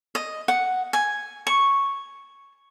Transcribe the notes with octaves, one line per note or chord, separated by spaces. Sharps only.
D#5
F#5
G#5
C#6